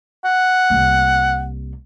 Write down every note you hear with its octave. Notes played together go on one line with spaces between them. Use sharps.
F#5
C2 A#3